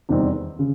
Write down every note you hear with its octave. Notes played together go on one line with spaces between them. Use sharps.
E2 C3 D#3 G3 C4
C#3